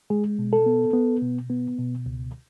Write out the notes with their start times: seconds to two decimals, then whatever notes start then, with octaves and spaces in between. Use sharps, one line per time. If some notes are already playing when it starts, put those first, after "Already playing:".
0.10 G#3 G#4
0.39 B2
0.53 A4
0.66 B3
0.93 B3
1.22 B2
1.50 B3
1.78 B2
2.06 C#2